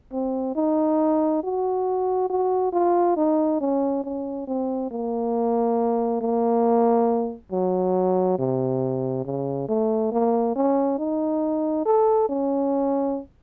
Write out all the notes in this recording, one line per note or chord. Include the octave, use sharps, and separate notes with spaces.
C4
D#4
F#4
F#4
F4
D#4
C#4
C#4
C4
A#3
A#3
F#3
C3
C#3
A3
A#3
C#4
D#4
A4
C#4